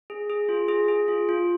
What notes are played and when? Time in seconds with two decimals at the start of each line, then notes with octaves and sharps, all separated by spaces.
0.10 G#4
0.30 G#4
0.49 F4
0.68 G#4
0.88 G#4
1.08 F4
1.29 F4